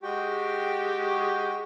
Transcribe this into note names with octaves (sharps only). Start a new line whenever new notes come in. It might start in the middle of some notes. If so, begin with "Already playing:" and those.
G#3 F#4 G4 G5